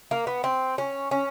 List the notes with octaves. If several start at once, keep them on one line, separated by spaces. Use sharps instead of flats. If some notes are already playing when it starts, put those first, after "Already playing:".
A#3
B3
C4
C#4
C#4